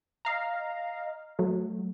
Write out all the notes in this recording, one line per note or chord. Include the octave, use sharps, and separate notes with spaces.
D#5 F5 A#5
F#3 A3